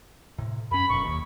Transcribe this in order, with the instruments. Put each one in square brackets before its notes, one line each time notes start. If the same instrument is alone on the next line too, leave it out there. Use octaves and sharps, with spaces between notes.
[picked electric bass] A2 C3
[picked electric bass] F#2 C#4 [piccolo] B5
[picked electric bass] F1 B1 [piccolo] C#6
[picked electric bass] D#2